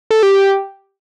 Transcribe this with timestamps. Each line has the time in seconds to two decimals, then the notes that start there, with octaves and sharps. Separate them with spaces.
0.11 A4
0.23 G4